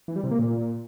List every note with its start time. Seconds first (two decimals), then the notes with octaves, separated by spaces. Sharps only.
0.08 E3
0.16 G3
0.24 C3
0.31 A#3
0.39 A#2